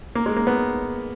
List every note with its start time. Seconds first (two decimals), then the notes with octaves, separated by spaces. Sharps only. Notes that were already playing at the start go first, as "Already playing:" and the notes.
0.15 A#3
0.26 G#3
0.36 A#3
0.47 B3